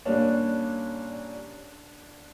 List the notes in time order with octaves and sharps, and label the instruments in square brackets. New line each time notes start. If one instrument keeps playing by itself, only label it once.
[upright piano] A#2 G3 A#3 C#4 D4